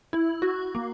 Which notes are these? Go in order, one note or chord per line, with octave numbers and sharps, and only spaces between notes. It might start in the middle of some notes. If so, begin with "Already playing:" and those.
E4
F#4
A#3